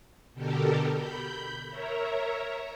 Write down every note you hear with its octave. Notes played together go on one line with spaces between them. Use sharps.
B2 D3 G4 A4 A#4
B5 G6
A#4 C#5 E5 A#5